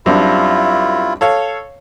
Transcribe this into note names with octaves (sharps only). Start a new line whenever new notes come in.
F#2 G3 C4 D4 E4 F4
A4 C#5 F5